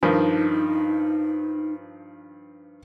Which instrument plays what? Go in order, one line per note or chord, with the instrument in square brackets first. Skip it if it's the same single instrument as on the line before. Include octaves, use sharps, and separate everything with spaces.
[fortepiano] G2 D#3 F3 [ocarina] D#4